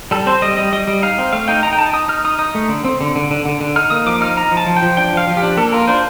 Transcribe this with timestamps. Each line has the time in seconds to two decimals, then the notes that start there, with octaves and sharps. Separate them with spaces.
0.11 G3 A4
0.26 C4 C5
0.42 G3 D#5
0.57 G3 D#5
0.73 G3 D#5
0.87 G3
1.02 D#4 F5
1.18 C4
1.33 A3 F5
1.48 D#4 G5
1.63 D#4 A#5
1.73 G5
1.78 D#4 A5
1.93 D#4 D#6
2.08 D#4 F6
2.24 D#4 D#6
2.39 D#4 D#6
2.55 A3
2.69 D3
2.85 C4
3.01 D3
3.16 D3
3.31 D3
3.46 D3
3.61 D3
3.76 D#4 F6
3.90 A#3 D#6
4.06 F3 D6
4.21 D#4 F6
4.37 D#4 A#5
4.51 F3
4.57 A5
4.66 F3
4.77 G5
4.83 F3
4.97 D4 G5
5.13 F3 F5
5.27 F3
5.37 G4
5.43 D4
5.57 A#3 A4
5.72 F4 A#4
5.87 D4 C5